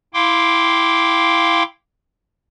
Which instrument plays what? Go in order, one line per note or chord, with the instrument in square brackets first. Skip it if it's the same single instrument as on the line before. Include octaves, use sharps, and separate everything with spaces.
[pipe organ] E4 F5 G5 C6 D6